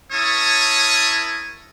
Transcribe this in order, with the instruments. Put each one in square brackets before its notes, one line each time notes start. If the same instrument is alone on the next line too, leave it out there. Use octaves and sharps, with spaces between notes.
[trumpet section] C#4 E4 A#4 C#5 A5 D#6